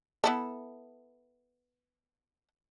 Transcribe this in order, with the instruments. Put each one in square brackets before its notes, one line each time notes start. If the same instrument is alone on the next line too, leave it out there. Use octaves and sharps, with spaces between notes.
[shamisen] B3 E4 A4